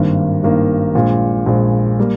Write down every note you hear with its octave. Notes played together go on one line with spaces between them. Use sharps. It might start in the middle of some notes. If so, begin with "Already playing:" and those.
Already playing: G#1 G2 D#3 A#3
G#1 G2 D#3 A#3
A#1 A#2 G#3
A#1 A#2 G#3
G3 A#3